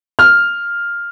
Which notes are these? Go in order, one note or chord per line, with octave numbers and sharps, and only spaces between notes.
F6